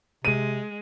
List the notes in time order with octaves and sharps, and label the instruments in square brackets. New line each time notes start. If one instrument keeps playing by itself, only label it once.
[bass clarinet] C3 [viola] G#3 [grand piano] D#7